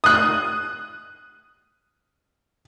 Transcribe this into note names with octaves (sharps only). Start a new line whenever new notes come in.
D#6 F#6